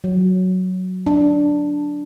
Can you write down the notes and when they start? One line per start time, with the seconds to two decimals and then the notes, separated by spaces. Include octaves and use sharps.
0.04 F#3
1.06 D4